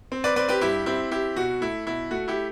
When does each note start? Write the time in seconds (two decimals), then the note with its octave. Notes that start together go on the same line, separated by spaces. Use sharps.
0.12 C4
0.24 B4 D5
0.36 C4 B4 D5
0.49 G4 B4
0.61 G2 E4 G4
0.86 C4 E4 G4
1.11 C4 E4 G4
1.36 B2 F#4
1.61 A3 E4
1.86 B2 E4
2.11 A3 F#4
2.28 E4 G4